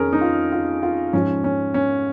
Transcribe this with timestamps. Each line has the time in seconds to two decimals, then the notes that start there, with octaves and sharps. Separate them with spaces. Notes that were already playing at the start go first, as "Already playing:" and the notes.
Already playing: F2 D#3 C#4 G#4 A#4
0.13 D#4
0.21 F4
0.52 F4
0.83 F4
1.13 G#2 F3 C#4
1.44 C#4
1.74 C#4